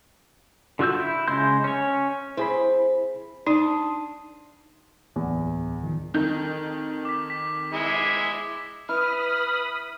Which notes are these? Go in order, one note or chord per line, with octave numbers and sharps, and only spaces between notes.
D3 F4 F#4 E6 G6
E4
C#3 G#3 C6 G6
C#4 C#5
C4 E4 G#4 B5
D4 D#4 C6 D#6
D1 E2
D#3 F3
F2 D#3 G6
D6 B6
B6
G#3 E4
E4 B4 B5 D#6 F6